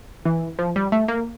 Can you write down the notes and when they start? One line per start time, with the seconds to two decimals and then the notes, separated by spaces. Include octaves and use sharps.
0.25 E3
0.59 F3
0.76 G3
0.92 A3
1.08 A#3